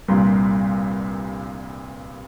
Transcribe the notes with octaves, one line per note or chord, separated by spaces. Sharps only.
C2 G2 A#2 A#5 C6